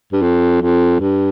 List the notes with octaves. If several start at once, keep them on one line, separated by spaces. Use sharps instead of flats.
G2
F2
F2
G2